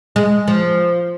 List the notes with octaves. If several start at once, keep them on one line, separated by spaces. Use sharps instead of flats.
G#3
F3